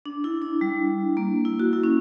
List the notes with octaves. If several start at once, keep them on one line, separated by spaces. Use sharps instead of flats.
D4
E4
D4
G3
A#3
E4
F#4
E4
C#4